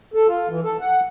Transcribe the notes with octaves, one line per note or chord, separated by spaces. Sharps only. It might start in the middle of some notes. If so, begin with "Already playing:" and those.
A4
F4
E3
A4
F#5